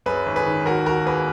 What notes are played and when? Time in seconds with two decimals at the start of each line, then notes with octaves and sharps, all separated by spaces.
0.06 F#2 G#4 B4
0.26 G#1
0.36 G#4 B4
0.46 D#3
0.66 D#2 F#4 A#4
0.86 D#2 F#4 A#4
1.06 A#3 G#4 B4